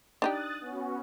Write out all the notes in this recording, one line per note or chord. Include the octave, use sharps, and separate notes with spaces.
D4 D#4 G4 D#6 F#6 A6
B3 C#4 F#4